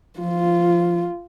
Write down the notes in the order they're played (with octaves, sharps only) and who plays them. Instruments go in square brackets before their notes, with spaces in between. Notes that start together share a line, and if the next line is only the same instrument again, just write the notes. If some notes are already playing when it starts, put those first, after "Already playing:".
[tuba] F3 [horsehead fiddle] F4